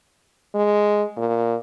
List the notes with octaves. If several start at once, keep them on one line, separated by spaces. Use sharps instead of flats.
G#3
A#2